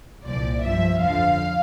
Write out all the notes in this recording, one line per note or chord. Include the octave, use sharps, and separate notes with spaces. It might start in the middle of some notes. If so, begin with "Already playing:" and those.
C2 A#2 F3 D5
G2 F3 E5
F2 D3 F3 F5